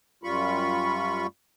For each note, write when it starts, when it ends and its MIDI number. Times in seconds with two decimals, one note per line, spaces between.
0.24 1.27 42
0.24 1.27 55
0.24 1.27 65
0.24 1.27 83
0.24 1.27 85